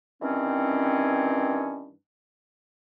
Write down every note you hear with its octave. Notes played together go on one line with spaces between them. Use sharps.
G2 D#3 E3 C4 C#4